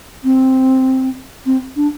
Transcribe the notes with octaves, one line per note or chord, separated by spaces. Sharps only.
C4
C4
D4